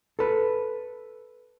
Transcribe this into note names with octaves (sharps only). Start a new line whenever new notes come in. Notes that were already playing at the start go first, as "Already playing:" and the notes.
A4 B4